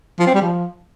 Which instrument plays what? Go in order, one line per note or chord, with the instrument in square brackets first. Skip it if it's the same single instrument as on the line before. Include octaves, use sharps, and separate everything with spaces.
[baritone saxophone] F3
C4
G3
F3